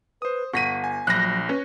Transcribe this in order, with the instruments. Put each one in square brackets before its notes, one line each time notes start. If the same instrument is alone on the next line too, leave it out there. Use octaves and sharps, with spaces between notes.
[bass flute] B4 [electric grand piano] C5 D#6
[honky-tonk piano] G1 B6 D#7 [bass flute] F#5 [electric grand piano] C#6 A#6
[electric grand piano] G#5
[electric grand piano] A#1 B5 G6 [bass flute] F#3 [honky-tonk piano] F#6 A#6
[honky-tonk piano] C#4 [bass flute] B4